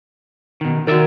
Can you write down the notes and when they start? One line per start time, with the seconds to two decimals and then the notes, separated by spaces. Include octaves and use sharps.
0.61 B2 D#3
0.87 D#3 F#4 A#4 D5 E5